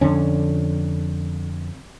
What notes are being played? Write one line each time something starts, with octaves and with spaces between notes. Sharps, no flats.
F2 D3 C#4